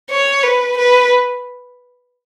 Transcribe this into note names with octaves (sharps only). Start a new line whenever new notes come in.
C#5
B4
B4